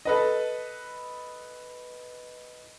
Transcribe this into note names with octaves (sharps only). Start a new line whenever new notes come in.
A4 B4 D#5